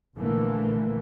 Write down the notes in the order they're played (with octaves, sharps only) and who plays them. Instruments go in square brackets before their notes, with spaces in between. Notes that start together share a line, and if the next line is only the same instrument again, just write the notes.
[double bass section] A#1 D3 E3 A3 A#3